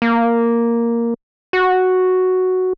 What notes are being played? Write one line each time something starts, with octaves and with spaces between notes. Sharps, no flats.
A#3
F#4